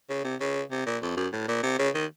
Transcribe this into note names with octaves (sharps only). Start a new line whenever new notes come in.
C#3
C3
C#3
C3
A#2
F2
F#2
A2
A#2
C3
C#3
D#3